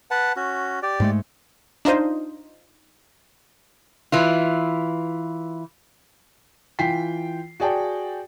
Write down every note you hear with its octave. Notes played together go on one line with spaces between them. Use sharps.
B4 F#5 A5
C#4 F#4
G4 D5
G#2 G#3 A3
D4 D#4 F4 C5 D#5
E3 E4 F4
E3 F4 G5 B6 C7
F#4 G#4 D5 G5 A5